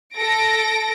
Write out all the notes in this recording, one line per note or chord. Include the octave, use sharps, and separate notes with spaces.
A4 A#6 D7